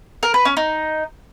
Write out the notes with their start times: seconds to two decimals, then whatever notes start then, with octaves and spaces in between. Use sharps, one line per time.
0.23 A#4
0.34 B4
0.45 C#4
0.57 D#4